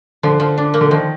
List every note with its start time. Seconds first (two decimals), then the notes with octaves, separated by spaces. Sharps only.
0.23 D3 F3
0.40 F3
0.58 D4
0.74 A#3
0.81 D3
0.91 D#3 F3